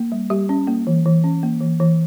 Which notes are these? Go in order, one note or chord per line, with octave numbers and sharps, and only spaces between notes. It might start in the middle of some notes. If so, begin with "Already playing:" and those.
Already playing: A#3
G3
G3 G4
C#4
A#3
E3
E3
C#4
A#3
E3
E3